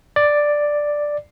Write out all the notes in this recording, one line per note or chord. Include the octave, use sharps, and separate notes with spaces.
D5